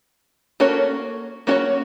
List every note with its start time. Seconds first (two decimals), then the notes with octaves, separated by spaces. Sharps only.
0.60 A#3 C#4 F#4 A4 C#5
1.47 A#3 C#4 F#4 A4 C#5